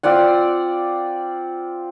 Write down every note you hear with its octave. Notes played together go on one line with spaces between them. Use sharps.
C4 F4 D5 F#5